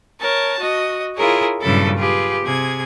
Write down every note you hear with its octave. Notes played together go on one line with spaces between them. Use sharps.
A#4 C#5 A5
F#4 D#5
E4 F4 G#4 A#4 C#5
G2 A#2 C#3 F#3 E4 A4
F4 G4 G#4 B4
C3 G#4 G#6